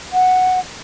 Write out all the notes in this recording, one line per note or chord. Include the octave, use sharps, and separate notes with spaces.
F#5